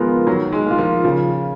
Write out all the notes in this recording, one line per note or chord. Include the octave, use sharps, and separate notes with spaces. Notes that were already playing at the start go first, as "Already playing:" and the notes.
Already playing: D#3 F3 G#3 B3 F4 A#4
D#3 F#3
G#3
A#3 F4
F3
C#3 F3